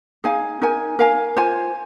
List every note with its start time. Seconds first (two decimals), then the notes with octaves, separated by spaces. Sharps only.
0.24 D#4 G#4 F5 G#5
0.62 D#4 A#4 G#5
0.99 A#4 F5 G#5
1.37 F4 C5 G#5